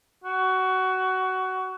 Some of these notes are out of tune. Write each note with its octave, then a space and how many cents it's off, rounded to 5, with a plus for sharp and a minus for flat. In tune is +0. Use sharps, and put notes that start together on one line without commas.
F#4 +20